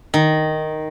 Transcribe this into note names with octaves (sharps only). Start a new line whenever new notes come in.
D#3